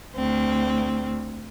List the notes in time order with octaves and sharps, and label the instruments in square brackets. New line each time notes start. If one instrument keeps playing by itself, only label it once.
[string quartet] D2 C4